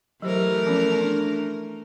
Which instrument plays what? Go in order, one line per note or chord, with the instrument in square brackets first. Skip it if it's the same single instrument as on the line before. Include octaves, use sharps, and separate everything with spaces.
[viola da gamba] E3 A3 A#4 [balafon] F#3 G4 C5
[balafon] F3 B3 C#4
D4